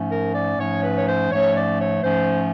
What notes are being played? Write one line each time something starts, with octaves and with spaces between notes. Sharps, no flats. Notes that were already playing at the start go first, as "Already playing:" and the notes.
Already playing: G#2 F3 A3 C#4
A#4
D5
G#2 F3 A3 C#4 C#5
B4
C#5
C5
G#2 F3 A3 C#4 C#5
D5
C#5
G#2 F3 A3 C#4 C5